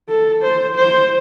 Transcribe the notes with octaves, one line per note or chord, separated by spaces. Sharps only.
A4
C5
C5